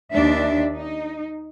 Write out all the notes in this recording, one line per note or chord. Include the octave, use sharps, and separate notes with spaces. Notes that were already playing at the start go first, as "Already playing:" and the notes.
D#2 D4 E5
D#4